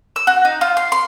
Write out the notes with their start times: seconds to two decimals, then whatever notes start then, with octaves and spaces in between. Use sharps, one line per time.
0.16 E6
0.27 F#4
0.45 D#4
0.61 F4
0.77 C6
0.92 C6